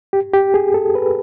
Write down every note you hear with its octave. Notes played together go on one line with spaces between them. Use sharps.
G4
G4
G#4
A4
B4